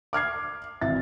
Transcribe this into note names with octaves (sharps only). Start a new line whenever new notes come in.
D6 F6 G#6 C7
G#1 E3 E5 A6